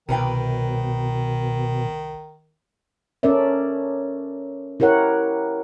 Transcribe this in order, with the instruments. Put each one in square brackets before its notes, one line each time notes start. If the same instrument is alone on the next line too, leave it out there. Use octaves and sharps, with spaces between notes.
[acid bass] C2 [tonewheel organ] B2 [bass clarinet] D#3 [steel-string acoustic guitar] A#4 B4 G5
[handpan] C#4 A4 A#4 D5 E5
E4 G4 A#4 C#5 F#5